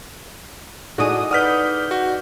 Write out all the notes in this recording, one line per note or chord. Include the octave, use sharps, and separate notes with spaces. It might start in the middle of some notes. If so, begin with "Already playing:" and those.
D#4 E4 F#4 G#4 A4 D5 D#6
B4 D5 F#5 D#6 F6 G6 B6
F#4